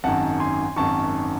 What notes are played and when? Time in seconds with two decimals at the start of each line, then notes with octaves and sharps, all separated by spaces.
0.04 G#1 F#2 D#3 F#5 A5
0.40 G#5 C6
0.76 G#1 F#2 D#3 A5 C#6